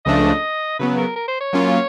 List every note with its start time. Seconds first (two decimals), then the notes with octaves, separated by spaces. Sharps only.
0.06 C#2 C#3 F3 A3 D4 D#5
0.79 C#3 F#3 B3 B4
0.98 A#4
1.16 A#4
1.28 C5
1.41 C#5
1.53 F#3 A#3 C#4 F4